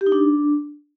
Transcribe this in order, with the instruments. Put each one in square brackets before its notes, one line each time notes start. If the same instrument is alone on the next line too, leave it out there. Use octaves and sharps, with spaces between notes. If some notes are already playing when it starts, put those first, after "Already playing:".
[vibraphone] G4
D#4
D4